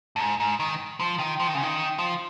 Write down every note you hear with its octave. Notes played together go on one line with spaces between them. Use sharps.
G2
G#2
G#2
D#3
F3
D#3
F3
D#3
C#3
D#3
F3